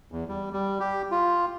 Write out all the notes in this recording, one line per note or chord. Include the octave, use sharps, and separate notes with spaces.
E2
G3
G3
G4
F4